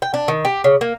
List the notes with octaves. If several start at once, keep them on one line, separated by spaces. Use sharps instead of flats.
G5
D4
D#3
G4
C#3
A#3